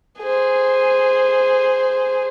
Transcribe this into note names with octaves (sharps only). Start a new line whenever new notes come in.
G#4 C5